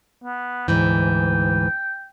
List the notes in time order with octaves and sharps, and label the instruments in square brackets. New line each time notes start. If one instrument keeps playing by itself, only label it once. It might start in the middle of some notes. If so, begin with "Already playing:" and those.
[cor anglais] B3
[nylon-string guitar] D2 G#2 E3 [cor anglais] G5